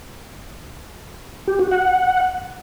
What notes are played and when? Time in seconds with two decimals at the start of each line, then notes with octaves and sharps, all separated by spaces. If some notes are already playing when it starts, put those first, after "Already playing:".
1.48 G4
1.59 F#4
1.71 F#5